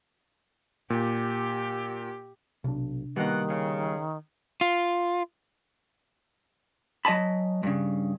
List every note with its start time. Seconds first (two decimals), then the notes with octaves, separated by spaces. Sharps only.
0.90 A#2 G4
2.64 B1 C3 D4
3.16 B2 D#3 G3 A#3 F#5
3.49 C#3
4.61 F4
7.05 F#3 D#5 G#5 A5 B5
7.63 G2 C#3